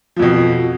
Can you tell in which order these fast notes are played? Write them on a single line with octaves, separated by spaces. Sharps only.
F3 F2 B2